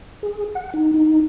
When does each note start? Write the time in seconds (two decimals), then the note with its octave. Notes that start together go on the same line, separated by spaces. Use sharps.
0.23 G#4
0.55 F#5
0.74 D#4
0.94 D#4